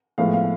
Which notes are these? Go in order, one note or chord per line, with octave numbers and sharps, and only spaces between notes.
A2 F3 G#3 B3 F5
F5